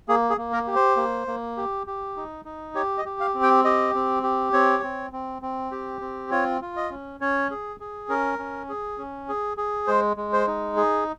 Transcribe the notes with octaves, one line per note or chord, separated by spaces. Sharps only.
A#3 G#4
G#4
A#3
A#4
G4
C5
A#3
A#3
G4
G4
D#4
D#4
G4 C#5
D#5
G4
F5
C4
G5
G4 D#5
C4
G4
C4 C#5
C4
C4
C4
G4
C4
F4 C#5
F4
D#5
C#4
C#4 C#5
G#4
G#4
C#4 A#4
C#4
G#4
C#4
G#4
G#4
G#3 C5
G#3
C5
D#4
G#4